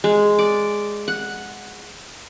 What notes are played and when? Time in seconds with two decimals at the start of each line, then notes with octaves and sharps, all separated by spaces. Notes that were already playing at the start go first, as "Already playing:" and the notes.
0.04 G#3
0.39 D5
1.08 F#5